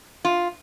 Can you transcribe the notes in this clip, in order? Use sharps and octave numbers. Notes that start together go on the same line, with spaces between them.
F4